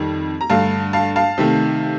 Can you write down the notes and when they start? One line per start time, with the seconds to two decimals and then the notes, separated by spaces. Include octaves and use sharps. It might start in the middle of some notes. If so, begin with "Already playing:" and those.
Already playing: F2 D#3 G3
0.41 A#5
0.50 G2 D3 A3 F5 A5
0.93 F5 A5
1.16 F5 A5
1.38 C3 D#3 A3